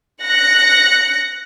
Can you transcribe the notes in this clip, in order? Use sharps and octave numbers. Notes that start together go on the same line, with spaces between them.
F#6 A#6 C#7